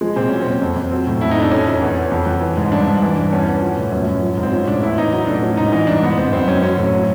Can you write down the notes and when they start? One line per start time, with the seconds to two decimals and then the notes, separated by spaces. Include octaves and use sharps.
0.01 F3 G#3
0.16 A#2 C4
0.29 F#3 C#4
0.42 A#2 C4
0.62 F2
0.76 F2
0.91 F#3 C4
1.07 A2
1.21 F2 E4
1.31 D#4
1.37 F2 D4
1.52 F2 C#4
1.67 F2
1.81 E2
1.97 E2
2.12 F2
2.27 F2
2.42 E3
2.57 G#2
2.72 G2 D4
2.87 G2
3.02 E3
3.16 G2
3.32 E2 C#4
3.47 E2
3.62 F3
3.77 A2
3.92 F#2 C#4
4.07 F#2
4.22 F3
4.37 G#2
4.43 C4
4.52 F3 C#4
4.67 A2 D4
4.83 E2 E4
4.98 E2 D#4
5.13 F#3 D#4
5.27 A2 D4
5.42 F3 C#4
5.57 G#2 D#4
5.72 E3 D#4
5.87 G2 D4
6.02 G#2 B3
6.18 G#2 C4
6.33 F#2 C4
6.48 F#2 C#4
6.63 F#3 C#4
6.77 A2
6.93 F#3